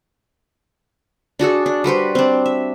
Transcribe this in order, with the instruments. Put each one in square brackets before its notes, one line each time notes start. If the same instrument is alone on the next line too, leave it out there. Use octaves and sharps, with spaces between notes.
[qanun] D4 F#4 G#4 A4
D4
G3 F#4 B4 C5
C4 D4
E5